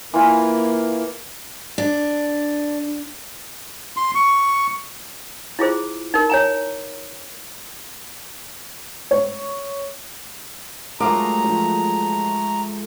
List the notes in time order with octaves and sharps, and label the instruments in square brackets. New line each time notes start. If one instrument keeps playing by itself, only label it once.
[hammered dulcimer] E3 F4 B5 [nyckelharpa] A#3
[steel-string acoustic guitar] D4
[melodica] C6
C#6
[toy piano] E4 F4 G#4 C5
D#4 A#4
C#5 G#5 A#5
[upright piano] C#5
[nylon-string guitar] F#3 F4 A#4 [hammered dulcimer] G#3 A3 [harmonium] A#5 [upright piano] D6
[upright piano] F3